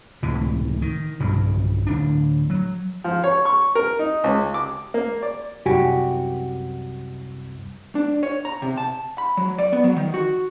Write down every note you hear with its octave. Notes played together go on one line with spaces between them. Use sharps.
C#2 A2 C3 E3
D#3
B1 G2 C#3 F#3
D1 D4
F#3
F3
C#5
C#6
A#4
D#4
C#2
D6
A#3
D5
C2 F#2 F#4 G4 G#5
D4
C#5
A#5
C3
A5
B5
F#3
D5
B3
F#3
D#3
F#4